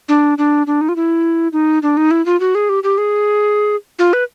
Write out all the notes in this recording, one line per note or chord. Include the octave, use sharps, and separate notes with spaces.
D4
D4
D4
D#4
F4
E4
D#4
D4
D#4
E4
F4
F#4
G#4
G4
G4
G#4
F4
B4